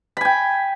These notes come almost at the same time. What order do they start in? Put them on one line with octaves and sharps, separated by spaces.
B5 G#5 G5